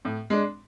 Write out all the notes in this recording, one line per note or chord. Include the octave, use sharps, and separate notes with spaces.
A2
G#3 D4